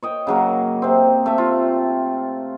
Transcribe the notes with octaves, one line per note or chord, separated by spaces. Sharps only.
C#5 D#5 G5
C#3 F#3 A#3
C3 C4
A3 E5
F4